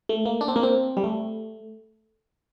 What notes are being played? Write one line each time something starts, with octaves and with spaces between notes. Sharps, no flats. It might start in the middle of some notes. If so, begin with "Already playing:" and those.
A3
A#3
D4
C4
A#3
C4
G3
A3